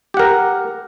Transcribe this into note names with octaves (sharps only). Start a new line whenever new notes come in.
G4 A#4 F#5